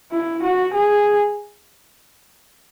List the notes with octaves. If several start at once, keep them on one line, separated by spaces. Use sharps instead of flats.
E4
F#4
G#4